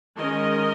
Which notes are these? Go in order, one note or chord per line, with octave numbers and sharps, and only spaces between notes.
D#3 G#3 C#4 A#4 D#5